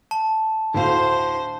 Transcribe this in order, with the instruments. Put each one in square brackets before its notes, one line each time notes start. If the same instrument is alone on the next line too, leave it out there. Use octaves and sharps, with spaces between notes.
[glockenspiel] A5
[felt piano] D2 A2 F5 [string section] C5